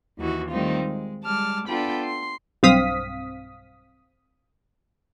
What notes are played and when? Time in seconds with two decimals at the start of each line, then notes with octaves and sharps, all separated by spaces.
0.18 D#2 E3 D#4 E4 F#4
0.49 D#3 G3 A3 C4 D#4 F4
0.82 G#3
1.21 G3 G#3 A5 D6 F6
1.67 B3 D4 F4 A4 G5 B5
2.04 C6
2.63 B1 G2 C4 F5 D#6 B6